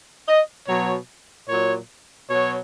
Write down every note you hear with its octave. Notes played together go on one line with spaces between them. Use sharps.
D#5
B2 F#3 C#5
A#2 F#3 C#5
B2 F#3 C#5